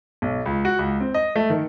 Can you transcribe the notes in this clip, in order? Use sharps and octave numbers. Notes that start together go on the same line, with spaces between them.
B1
C#2
F#4
C#2
C4
D#5
A3
D#3